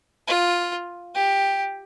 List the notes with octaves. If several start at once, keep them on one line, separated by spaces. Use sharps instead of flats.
F4
G4